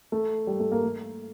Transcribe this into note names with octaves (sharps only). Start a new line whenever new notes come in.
A3
G3
A3
A#3
A3